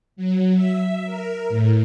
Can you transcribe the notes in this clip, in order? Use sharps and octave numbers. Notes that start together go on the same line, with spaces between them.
F#3
E5
A#4
A2